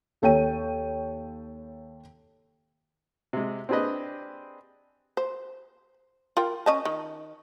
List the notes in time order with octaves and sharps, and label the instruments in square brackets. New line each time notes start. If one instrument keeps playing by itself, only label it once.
[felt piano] D#2 A4 C#5 G5 D#7
[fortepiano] C3 G#3
C4 D4 G4 G#4 B4 D#5
[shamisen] C5
F4 A#4 G5
C#4 D#5 A5
D#3